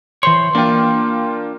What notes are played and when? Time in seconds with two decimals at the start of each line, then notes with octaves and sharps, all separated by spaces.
0.23 E3 C5 C#5 C6
0.55 A#3 D4 F4 G5